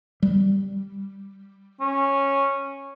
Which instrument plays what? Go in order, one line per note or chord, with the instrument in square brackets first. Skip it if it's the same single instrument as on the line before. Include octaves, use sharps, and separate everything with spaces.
[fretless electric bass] G3
[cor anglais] C#4